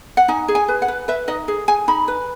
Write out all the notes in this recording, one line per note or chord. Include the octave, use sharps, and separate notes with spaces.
F#5
D#4 G#5
G#4
G#5
B4
F#5
B4
B4 E5
D#4 D#5
G#4
G#4 G#5
D#4 B5
B4